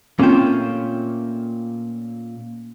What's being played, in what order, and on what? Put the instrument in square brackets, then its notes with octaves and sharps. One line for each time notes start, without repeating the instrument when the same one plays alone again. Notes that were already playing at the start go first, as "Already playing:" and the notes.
[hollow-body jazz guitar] A#2 A3 [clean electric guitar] A#3 G5 [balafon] C4 [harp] C#4 F4 E7